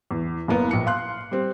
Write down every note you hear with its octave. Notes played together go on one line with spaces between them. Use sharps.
E2
F#1 A#3 B3
A#1 C#7
F5 C6 F#6
G3 C4